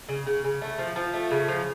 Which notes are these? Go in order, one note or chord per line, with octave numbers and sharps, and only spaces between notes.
C#3
C#3
C#3
A3
F3
F3
A3
C#3
F3